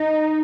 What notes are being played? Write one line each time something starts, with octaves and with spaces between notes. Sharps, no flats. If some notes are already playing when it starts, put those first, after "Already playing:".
Already playing: D#4